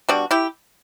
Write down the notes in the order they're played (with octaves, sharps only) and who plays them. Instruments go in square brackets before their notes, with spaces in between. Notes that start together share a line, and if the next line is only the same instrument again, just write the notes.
[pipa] B2 G3 D4 F#4
E4 G4